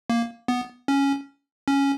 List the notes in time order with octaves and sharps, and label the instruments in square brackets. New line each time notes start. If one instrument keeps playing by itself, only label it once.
[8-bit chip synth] A#3
B3
C#4
C#4